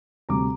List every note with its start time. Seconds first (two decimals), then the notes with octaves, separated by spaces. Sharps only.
0.29 D2 C3 G3 A#5 D6